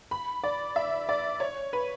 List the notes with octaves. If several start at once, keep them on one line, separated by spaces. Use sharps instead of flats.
B5
D5
E5
D5
C#5
B4